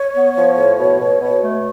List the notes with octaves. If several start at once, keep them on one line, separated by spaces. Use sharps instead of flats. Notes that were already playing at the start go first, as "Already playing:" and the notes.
Already playing: C#5
B3
F3
A2
B2
B2
B2
A3